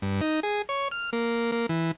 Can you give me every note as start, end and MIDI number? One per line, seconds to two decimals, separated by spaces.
0.02 0.21 43
0.21 0.40 63
0.43 0.62 68
0.69 0.88 73
0.91 1.10 89
1.13 1.52 58
1.52 1.66 58
1.69 1.91 52